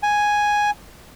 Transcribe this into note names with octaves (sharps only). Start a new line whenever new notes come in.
G#5